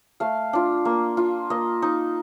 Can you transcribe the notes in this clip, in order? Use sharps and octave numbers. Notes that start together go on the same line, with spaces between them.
A3 F5
D4 F4
A#3
F4
A#3 D#5
D#4